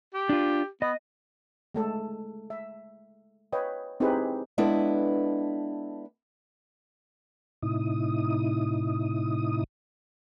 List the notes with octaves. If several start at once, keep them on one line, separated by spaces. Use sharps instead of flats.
G4
D4 F4
B3 D#5
G#3 A3 A4
E5
B4 C#5 D#5 F5 G5
C4 D#4 E4 G4 G#4 B4
G#3 B3 D4 E4 A4 B4
A2 C3 D#4 E4 D#6